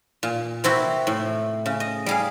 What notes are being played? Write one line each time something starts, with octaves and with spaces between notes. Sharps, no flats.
A#2
C3 C4 E4 F#4
A2
C#3
D#5
G3 G#4 F5